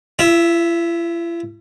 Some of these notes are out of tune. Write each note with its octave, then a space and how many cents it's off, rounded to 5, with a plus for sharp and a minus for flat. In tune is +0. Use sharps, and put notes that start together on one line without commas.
E4 +45 E5 +0